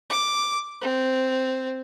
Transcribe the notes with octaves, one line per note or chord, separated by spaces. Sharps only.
D6
C4